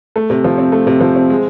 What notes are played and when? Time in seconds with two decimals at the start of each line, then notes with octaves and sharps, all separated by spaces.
0.16 A3
0.30 C3
0.44 F3
0.58 C4
0.72 A3
0.87 C3
1.01 F3
1.15 C4
1.30 G#3